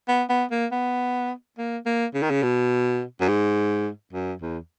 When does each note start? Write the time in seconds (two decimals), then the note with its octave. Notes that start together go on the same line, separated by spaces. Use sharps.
0.08 B3
0.30 B3
0.51 A#3
0.72 B3
1.58 A#3
1.86 A#3
2.14 C#3
2.23 D#3
2.31 C#3
2.43 B2
3.21 F#2
3.29 G#2
4.13 F#2
4.42 E2